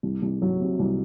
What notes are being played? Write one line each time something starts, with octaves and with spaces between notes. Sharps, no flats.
C2
C2
F#3
C3
C2